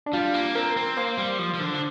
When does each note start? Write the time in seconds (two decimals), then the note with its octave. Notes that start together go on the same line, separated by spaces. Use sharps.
0.06 D4
0.13 G3 F4
0.34 A#3
0.55 C4 A#4
0.77 C4
0.97 A#3 C5
1.18 G3
1.39 F3
1.54 F3
1.60 D3
1.75 D4